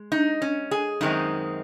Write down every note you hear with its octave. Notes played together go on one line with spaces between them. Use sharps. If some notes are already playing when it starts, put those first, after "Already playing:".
Already playing: G#3
D#4
C#4
G#4
F#2 D#3 G#3 C4 D#4